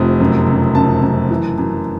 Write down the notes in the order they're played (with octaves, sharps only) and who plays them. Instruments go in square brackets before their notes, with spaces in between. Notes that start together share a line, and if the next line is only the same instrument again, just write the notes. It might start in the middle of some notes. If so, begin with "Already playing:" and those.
Already playing: [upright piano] F1 C3 D#6
F#2
C#3
F#2 A5
F#2
E3
F#2